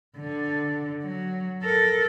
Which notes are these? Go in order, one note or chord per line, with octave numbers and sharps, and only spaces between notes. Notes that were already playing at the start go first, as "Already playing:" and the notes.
D3
F#3
A4 A#4